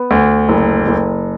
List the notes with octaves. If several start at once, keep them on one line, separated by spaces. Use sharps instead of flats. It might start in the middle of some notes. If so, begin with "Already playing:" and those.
Already playing: B3
D2
F#1
F#1